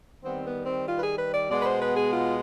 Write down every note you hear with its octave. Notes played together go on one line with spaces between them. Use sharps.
D#3 G3 B3 C4
B3
C4
F4
B4
G#4
B4
D5
B2 G#3 B3 D5
B4
C5
B4
G#4
F4